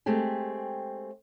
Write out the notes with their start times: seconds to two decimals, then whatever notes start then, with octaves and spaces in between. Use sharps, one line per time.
0.06 G#3 A3 C4 G4 G#4